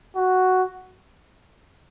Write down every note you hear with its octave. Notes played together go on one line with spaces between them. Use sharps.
F#4